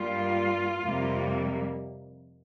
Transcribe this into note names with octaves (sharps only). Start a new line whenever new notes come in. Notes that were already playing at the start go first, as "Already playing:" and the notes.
Already playing: G2 G3 A#3 F4
F2 C3 G3 A#3